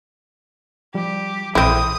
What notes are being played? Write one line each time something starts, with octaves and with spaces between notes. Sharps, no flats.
F3 G3 G4
A#1 E3 C4 E4 A4 D#6